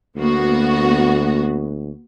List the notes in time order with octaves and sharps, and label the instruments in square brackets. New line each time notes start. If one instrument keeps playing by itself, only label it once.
[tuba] D2 [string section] A#3 B3 F#4